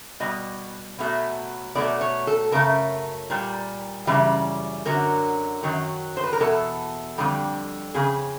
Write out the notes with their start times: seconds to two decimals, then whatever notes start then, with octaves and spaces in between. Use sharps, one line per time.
0.20 B2 G3 D#5
0.99 B2 F#3 A3
1.75 B2 F#3 A3 D5
2.01 C#5
2.27 A4
2.52 F#2 C#3 A3 A#4
3.30 A#2 G3
4.07 F#2 C#3 E3 G3
4.86 F#2 D3 F#3 A#4
5.63 F#2 D#3 F#3
6.17 C5
6.24 B4
6.33 A#4
6.40 E2 B2 A4
7.18 F2 D3 G3
7.94 F2 C#3 G#4